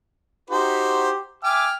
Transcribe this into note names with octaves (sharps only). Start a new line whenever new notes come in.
D#4 F#4 G4 C5
E5 G5 G#5 D6 F6